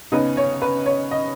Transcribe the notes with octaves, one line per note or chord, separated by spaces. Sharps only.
C#3 B3 D#4 B4
C#5
B4
C#5
D#5